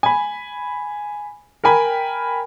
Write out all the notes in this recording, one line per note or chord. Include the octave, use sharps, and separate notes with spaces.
G#5 B5
A#4 G5 G#5 B5